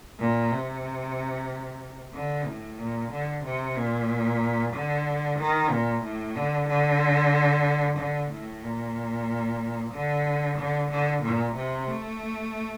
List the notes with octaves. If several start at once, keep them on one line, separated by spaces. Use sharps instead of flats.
A#2
C3
D3
A2
A#2
D3
C3
A#2
D3
D#3
A#2
A2
D3
D3
D3
A2
A#2
D3
D3
D3
A#2
C3
A3